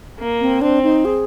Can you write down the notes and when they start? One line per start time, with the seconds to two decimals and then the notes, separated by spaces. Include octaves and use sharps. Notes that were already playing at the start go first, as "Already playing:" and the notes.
0.18 A#3
0.41 C4
0.62 C4 D4
0.83 D#4
1.05 G#4